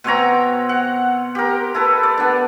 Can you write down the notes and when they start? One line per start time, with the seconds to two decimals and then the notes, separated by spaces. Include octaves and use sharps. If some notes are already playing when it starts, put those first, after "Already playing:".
0.04 B2 C4 C#5 A#5
0.69 F#5
1.35 G4 A#4
1.75 E4 A4 B4
2.03 D5
2.17 B3 D4